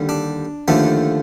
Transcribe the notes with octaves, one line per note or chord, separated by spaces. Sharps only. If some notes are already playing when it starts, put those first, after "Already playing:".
Already playing: D#2 D3 G3
D4
D#2 D3 F3 A3